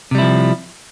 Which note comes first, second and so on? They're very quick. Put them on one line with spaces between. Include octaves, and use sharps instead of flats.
C3 G3 E4 F3